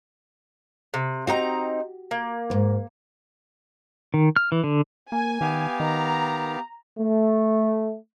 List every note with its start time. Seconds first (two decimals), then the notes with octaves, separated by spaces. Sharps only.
0.94 C3
1.27 C4 D#4 F#4 G4 A#5
2.11 A#3
2.50 F2 G#2
4.14 D#3
4.36 F6
4.52 E3
4.64 D3
5.12 A#3 G#5
5.41 D#3 B3 G4 F5
5.80 D#3 A#5
7.00 A3